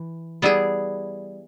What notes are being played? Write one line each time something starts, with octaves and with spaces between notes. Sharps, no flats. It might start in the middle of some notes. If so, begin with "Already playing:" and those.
Already playing: E3
G3 B3 E4 G#4